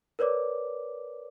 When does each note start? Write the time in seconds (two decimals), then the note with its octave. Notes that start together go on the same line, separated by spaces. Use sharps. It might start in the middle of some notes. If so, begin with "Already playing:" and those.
0.19 A#4 B4 C#5 D5 D6